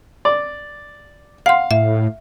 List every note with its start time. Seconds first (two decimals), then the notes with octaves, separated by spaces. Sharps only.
0.25 D5
1.46 F5 F#5 C6
1.71 A2 E5